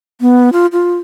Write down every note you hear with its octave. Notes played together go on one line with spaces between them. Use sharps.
B3
F4
F4